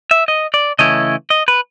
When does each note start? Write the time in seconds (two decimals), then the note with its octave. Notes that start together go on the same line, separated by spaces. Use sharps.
0.11 E5
0.28 D#5
0.54 D5
0.79 C#3 E3 A3 C#4 E4 D#5
1.30 D#5
1.48 B4